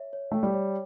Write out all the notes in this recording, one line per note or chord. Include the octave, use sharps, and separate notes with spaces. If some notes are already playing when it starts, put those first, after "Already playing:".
Already playing: C#5 E5
C#5
A3 G5
G3
C#5